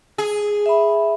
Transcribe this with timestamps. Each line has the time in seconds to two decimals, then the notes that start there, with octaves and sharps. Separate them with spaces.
0.18 G#4
0.66 E5 B5